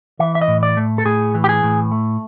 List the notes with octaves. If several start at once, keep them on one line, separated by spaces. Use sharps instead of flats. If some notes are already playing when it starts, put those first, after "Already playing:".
E3 E5
E5
D#5
A2
D5
A3
A4
A2 G#4
E3
G4
G#4
A2
A3